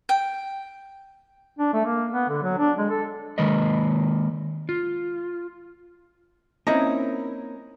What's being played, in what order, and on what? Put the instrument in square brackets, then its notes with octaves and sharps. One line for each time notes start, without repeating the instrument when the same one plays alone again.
[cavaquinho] G5
[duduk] D4
A3
A#3
B3
D3
F#3
D4
G#3
A4
[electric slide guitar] D#3 G#3 A#3 B4 D#5
F4
[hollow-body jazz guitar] A#3 C4 C#4 [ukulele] D#4 E4 A#4